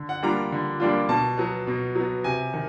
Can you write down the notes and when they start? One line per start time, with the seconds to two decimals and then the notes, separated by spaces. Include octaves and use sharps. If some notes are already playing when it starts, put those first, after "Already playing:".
Already playing: D3
0.09 F#5
0.23 G3 A#3 D4 F4 A#5
0.52 D3
0.80 G3 A#3 D4 F4
1.09 B2 A5
1.37 F#3 B3
1.67 B2
1.95 F#3 B3
2.24 C3 G#5
2.53 D#3